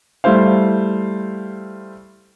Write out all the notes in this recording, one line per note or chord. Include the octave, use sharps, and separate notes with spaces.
G3 A3 E4 C5 F5